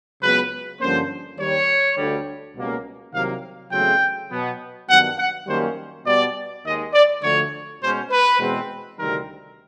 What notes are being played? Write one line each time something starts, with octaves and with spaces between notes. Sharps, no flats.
C#2 C#3 F#3 B3 B4
G2 D3 F3 A#3 C#4 C5
D#2 D#3 G3 C#5
D2 D3 G3
C#2 B2 G3 A#3 C#4
C2 C3 D#3 F#3 A#3 F5
E2 C#3 F#3 A3 C4 G5
B2 F#3 B3
G2 D#3 F#3 B3 F#5
F#5
F#2 D#3 G3 A#3 C#4 C5
B2 G3 B3 D5
D#2 D#3 G#3 D#5
D5
D2 D3 F3 A3 C#5
B2 G#3 C#4 C5
B4
E2 B2 G#3 C4
D2 C3 D#3 G3 C4 A#4